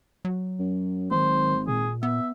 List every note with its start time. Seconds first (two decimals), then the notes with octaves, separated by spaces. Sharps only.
0.25 F#3
0.59 F#2
1.11 G#1 D#3 C5
1.67 A#2 G#4
2.03 B3 E5